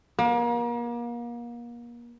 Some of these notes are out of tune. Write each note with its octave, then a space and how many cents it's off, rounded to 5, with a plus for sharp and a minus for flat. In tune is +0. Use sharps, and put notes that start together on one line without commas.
A#3 +35